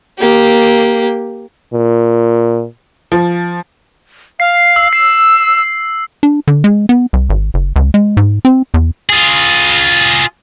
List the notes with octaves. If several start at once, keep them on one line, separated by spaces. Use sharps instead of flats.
A#3 G4
A#2
F3
F5 C7
E6
E6 C7
D4
D3
G#3
B3
C2
G#1
F#1
C#2
G#3
G#2
C4
E2
F4 G#4